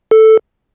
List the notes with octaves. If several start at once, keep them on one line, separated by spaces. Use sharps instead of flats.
A4